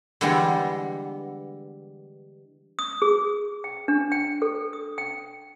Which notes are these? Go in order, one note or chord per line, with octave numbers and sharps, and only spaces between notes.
D3 E3 G3 G#3 B3
D#6
G#4
G5
D4
G5
A4
D#6
G5